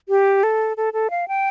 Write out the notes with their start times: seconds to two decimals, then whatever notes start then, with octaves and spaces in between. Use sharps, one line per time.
0.09 G4
0.43 A4
0.77 A4
0.93 A4
1.10 F5
1.28 G5